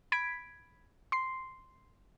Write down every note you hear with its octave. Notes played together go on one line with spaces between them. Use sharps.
B5 G#6 B6 D7
C6 C7